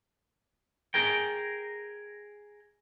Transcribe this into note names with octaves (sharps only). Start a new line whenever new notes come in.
G#4 A#4 G5